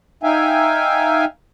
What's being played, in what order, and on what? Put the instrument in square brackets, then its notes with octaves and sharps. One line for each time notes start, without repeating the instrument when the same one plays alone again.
[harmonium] D#4 E5 F5 G5 G#5